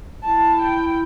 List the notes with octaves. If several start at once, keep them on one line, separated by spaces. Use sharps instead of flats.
E4 A5
G5